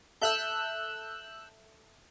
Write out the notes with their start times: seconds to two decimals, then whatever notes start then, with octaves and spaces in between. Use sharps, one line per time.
0.21 A4 E5 E6 F#6 G6